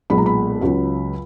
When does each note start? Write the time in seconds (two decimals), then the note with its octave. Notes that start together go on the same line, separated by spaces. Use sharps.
0.10 B1 A#2 G#3 B3 B5
0.18 A#5
0.26 B5
0.61 C#2 C#3 F#3